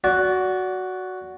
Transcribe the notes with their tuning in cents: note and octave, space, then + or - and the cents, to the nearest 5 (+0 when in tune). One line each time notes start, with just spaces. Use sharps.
F#4 +0 D5 -25